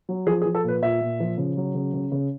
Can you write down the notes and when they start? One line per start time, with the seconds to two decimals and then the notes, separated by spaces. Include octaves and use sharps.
0.09 F#3
0.27 F3 G#4
0.42 G#4
0.45 F3
0.55 A4
0.64 A#2 B4
0.82 A#2 E5
1.01 A#2
1.20 F3
1.38 C#3
1.57 F#3
1.75 C#3
1.94 C#3
2.12 C#3